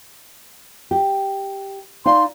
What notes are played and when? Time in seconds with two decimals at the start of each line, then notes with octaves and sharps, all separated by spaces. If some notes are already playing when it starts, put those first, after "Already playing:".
0.91 G4
2.06 D#4 D5 F5 C6